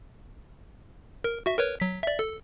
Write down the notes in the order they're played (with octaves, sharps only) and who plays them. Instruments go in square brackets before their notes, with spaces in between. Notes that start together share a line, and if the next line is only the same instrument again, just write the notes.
[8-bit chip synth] A#4
F#4 E5
A#4 B4 C#5
F#3 B6
D5 E5
A4